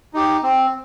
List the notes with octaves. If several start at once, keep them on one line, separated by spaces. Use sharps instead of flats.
D#4 G4
C4